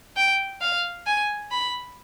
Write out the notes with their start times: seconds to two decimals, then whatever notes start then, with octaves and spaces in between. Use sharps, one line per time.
0.17 G5
0.61 F5
1.07 G#5
1.51 B5